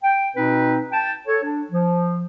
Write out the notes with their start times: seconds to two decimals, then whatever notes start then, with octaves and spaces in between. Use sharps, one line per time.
0.03 G5
0.36 B2 C4 D#4 B4
0.92 G5 A5
1.27 A4 C#5
1.43 D4
1.71 F3